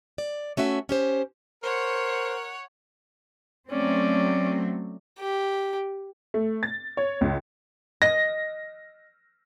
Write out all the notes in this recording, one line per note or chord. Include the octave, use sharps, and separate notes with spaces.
D5
A3 C#4 F#4 E5
C#4 G4 C5
A#4 C5 C#5 F#5
F#3 A3 C4 C#4 D5
G4
A3
A6
C#5
C#2
D#5 A#6